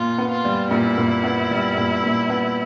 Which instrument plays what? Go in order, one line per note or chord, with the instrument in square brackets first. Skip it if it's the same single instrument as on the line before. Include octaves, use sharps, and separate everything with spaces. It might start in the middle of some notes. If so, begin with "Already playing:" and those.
Already playing: [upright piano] A#2 [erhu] F4
[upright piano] B3
[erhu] F4
[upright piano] G3
[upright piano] A#2 [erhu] E4
[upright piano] A#2
B3
G3
A#2
A#2
B3